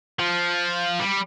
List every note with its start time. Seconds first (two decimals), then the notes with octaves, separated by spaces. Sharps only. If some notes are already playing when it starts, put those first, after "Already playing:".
0.19 F3
0.99 G3